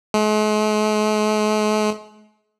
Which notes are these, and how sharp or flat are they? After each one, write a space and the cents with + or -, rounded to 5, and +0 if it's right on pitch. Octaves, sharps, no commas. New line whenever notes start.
G#3 +45